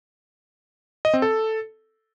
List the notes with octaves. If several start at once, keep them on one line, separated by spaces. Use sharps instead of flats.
D#5
C4
A4